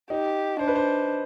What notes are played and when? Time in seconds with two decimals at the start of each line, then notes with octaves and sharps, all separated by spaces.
0.10 D#4 G4
0.59 D4 C5
0.68 B4
0.75 C5